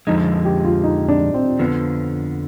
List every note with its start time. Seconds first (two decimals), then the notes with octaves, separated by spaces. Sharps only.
0.07 F2 D3 F3 G#3 D#4
0.45 G4
0.65 F4
0.84 D#4
1.09 D4
1.34 C4
1.59 F2 D3 F3 B3